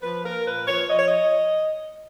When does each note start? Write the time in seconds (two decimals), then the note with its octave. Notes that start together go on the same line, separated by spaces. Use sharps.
0.02 F3 B4
0.24 A#3 A#4
0.45 A#2 B4
0.67 F3 C#5
0.88 F3 D#5
0.98 C#5
1.07 D#5